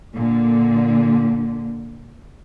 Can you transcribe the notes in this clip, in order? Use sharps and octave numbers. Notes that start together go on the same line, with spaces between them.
A#2 D3